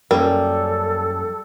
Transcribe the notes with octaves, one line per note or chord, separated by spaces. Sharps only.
F#2 G3 A#3 C#4 A4 A#4